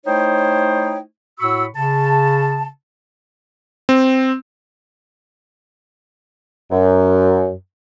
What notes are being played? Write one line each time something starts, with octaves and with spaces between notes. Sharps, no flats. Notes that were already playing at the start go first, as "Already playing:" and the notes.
A3 D#4 E4 C5 C#5 G5
A2 F#4 B5 C#6 E6
C#3 A5
C4
F#2